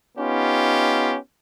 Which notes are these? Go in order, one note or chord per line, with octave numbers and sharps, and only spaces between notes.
B3 C#4 D#4 F4 G4